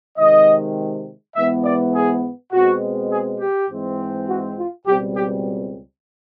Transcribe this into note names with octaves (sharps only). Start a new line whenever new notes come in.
C3 D#3 G#3 D#5
G#2 E3 G#3 B3 E5
D5
G#4
B2 G#3 C4 F#4
G#4
G4
G#2 E3 G#3 C4
F#4
F4
C#2 B2 G3 C4 G4
G4